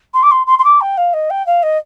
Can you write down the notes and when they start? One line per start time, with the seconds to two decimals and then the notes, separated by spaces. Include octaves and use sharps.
0.13 C6
0.22 D6
0.31 C6
0.46 C6
0.58 C6
0.64 D6
0.81 G5
0.97 F5
1.13 D#5
1.30 G5
1.46 F5
1.62 D#5